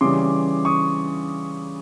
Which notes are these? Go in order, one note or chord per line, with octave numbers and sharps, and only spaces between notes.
C#3 E3 G3 C6 D6
C#6 D#6